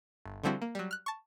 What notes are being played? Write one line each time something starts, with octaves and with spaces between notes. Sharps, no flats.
G1
D3 F3 G3 C4 E4 F#4
A#3
F#3 G3
F6 F#6
A5 C#6